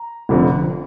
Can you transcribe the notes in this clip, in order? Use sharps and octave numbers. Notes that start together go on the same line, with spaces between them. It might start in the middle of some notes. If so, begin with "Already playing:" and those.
Already playing: A#5
F1 F2 D3 F3